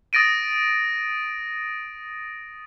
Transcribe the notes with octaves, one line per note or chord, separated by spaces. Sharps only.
D#6 A6 A#6 D7 D#7